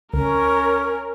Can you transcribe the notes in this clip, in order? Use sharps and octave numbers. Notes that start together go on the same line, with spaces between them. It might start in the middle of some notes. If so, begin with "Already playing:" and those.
C#2 C#4 A#4